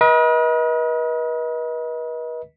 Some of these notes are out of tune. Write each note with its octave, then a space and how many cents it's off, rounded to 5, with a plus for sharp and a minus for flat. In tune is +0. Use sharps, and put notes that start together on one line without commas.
B4 -40 D#5 +30